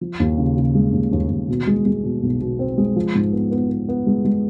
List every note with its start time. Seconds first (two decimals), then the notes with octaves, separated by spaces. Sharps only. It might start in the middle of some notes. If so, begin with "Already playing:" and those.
0.01 F3
0.20 D#2
0.38 C#3
0.56 C#3
0.75 G#3
0.93 D#2
1.12 D#2
1.30 D#2
1.49 B2
1.67 G#3
1.86 G#3
2.04 B2
2.23 B1
2.41 B2
2.59 C4
2.78 G#3
2.96 F3
3.15 G#2
3.33 B3
3.51 B3
3.70 B3
3.89 B3
4.07 G#3
4.25 G#3